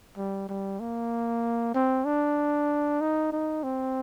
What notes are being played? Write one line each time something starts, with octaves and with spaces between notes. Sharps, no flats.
G3
G3
A#3
C4
D4
D#4
D#4
C4